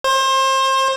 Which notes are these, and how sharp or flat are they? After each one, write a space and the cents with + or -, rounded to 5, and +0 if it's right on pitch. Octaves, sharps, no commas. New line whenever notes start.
C5 +30